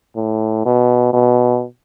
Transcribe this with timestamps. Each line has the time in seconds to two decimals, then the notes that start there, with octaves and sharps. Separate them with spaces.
0.16 A2
0.65 B2
1.13 B2